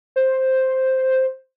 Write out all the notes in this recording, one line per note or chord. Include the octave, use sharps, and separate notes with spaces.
C5